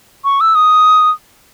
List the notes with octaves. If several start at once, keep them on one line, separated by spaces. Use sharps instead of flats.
C#6
E6
D#6